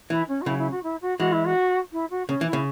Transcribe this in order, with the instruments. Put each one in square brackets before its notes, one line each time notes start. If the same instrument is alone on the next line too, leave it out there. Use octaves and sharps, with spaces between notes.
[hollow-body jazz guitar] E3 [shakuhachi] E4
[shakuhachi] C#4
F#4
[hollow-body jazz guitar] C#3 F#3 [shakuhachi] E4
[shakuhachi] E4
F#4
E4
F#4
[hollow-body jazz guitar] E3 G#3 [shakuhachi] F#4
[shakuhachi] E4
F#4
E4
F#4
[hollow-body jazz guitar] C#3 [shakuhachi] C#4
[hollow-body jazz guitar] E3
[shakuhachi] E4
[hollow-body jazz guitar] C#3